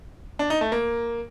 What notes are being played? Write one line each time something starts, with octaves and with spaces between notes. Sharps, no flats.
D4
D#4
A3
A#3